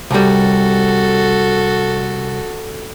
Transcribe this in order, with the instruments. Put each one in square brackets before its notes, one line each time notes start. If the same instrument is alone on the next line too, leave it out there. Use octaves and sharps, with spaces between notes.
[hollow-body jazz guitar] C2 G3 [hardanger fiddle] F#4 A4